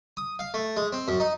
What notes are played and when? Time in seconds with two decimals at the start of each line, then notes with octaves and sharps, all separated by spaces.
0.17 D#6
0.39 F5
0.54 A3
0.77 G#3
0.92 C4
1.08 F#2
1.20 D#4